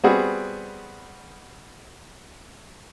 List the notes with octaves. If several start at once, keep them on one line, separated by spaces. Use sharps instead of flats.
G3 B3 C4 F#4 G#4